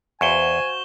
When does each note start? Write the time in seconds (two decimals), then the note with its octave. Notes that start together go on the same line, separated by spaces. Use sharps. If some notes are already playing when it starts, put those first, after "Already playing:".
0.21 E2 F#4 C5 F5 G#5 C#6 E7 G7